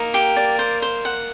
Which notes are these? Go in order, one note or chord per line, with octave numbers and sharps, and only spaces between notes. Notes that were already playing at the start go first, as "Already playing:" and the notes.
Already playing: A#3 D#4
G4
D5
C5
C5
F#5